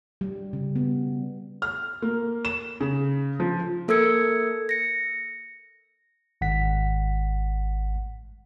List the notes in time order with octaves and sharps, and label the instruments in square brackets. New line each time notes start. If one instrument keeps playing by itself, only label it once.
[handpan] G3
C#3
B3
[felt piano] F6
A#3
E7
C#3
F3
[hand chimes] A#3 A4 A#4 E6 G#6 C#7
A#6 C#7
[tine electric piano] G#1 F#5 B6